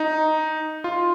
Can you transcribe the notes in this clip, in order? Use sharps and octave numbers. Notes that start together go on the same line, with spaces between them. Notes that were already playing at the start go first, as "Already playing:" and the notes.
Already playing: D#4
F4